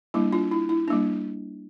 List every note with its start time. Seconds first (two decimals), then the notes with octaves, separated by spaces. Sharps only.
0.14 G3 A#3 D4 E4
0.33 D4 F4
0.51 E4
0.69 E4
0.88 G3 A#3 D4